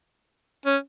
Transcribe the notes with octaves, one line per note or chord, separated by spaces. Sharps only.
C#4